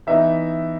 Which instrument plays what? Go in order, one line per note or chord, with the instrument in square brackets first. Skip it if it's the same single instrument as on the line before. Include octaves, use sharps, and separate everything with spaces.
[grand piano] E3 B3 D#4 E5